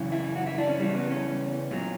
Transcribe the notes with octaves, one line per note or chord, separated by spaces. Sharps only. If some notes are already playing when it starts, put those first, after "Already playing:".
Already playing: F#2 C#3 E3
E4
F#4
E4
D4
C#4
E2 C#3 E3 G3
B3
C#4
A#2 F#3